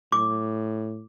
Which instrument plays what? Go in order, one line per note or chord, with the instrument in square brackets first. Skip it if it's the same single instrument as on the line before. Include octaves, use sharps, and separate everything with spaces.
[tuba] A2 [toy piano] D6